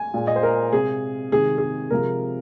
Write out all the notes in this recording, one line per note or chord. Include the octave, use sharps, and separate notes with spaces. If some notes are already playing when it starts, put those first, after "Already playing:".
Already playing: G#5
A#2 G#3
D#5
C5
A#4
C3 G#3 G#4
C3 D#3 G#3 G#4
G#4
C3 F3 G#3 A#4